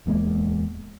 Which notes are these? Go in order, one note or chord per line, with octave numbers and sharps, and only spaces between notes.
D1 E2 G#3 A#3